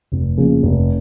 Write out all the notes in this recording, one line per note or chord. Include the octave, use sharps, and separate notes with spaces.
F1
F2 C#3 F3 A#3
F1